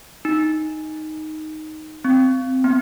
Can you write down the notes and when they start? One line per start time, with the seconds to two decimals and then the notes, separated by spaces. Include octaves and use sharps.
0.25 D#4
2.05 C4
2.64 B3